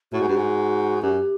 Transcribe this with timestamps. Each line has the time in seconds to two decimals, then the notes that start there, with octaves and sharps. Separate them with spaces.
0.12 A2 F#4
0.21 G#2
0.28 G2
0.37 G#2
1.02 F#2 G4